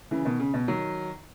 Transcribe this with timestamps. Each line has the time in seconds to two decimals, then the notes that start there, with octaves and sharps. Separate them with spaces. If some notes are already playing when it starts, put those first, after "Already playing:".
0.11 C#3 E3
0.25 B2 D#3
0.40 C#3
0.54 B2
0.68 D#3 F#3